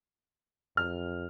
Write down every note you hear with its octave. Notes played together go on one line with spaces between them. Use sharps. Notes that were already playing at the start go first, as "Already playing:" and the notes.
F2 F6